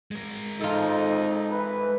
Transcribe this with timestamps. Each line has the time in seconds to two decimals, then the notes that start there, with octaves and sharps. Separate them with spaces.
0.11 G#3 A#4
0.61 F2 D#4 F4 A4
1.52 E3 B4